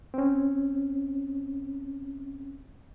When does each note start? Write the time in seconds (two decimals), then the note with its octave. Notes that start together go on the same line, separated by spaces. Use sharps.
0.14 C4 C#4